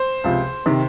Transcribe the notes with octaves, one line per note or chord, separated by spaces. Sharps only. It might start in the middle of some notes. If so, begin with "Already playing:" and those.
Already playing: C5
C#2 C3 F3
C3 D#3